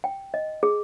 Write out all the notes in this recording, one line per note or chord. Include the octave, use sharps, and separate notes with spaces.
G5
D#5
G#4